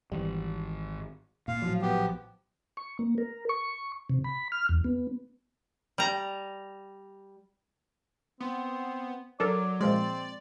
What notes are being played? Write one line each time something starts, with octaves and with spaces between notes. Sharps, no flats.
G#1 E3 G3
A#2 F5
A#1 A2 F3 F#3
B3 G4
C#6
A#3
A#4
C#6
C3
B5
F6
E2
B3
G3 A#5
B3 C4
F#3 D4 A4 A#4 D5
A#2 F3 G#3 C4 D5